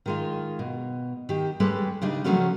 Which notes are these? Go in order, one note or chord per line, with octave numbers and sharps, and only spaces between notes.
D#3 G#3 F4
B2
D#3 G4
G3 G#3 C#4 A4 B4
C#3 G3 D4 D#4
C#3 F3 F#3 A3 C#4 F#4